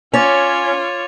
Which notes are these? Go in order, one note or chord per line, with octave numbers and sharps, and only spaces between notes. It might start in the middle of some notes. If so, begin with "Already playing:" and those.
C#4 F4 C#5 D6 A6 F7